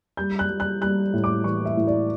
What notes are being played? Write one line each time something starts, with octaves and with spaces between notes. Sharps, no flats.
G3 G6
F#6
G3
F#6
G3 F#6
A2
D6
E3 C#6
E5
A2
D5